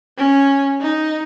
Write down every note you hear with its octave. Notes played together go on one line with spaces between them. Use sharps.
C#4
D#4